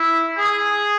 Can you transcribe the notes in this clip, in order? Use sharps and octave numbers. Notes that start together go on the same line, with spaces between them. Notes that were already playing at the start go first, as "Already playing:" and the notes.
Already playing: E4
G#4